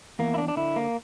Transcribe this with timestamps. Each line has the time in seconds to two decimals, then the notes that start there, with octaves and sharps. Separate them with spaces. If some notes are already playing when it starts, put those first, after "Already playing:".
0.19 E2 A#3
0.34 E4
0.38 D4
0.48 D4
0.56 D3 E4
0.76 A#3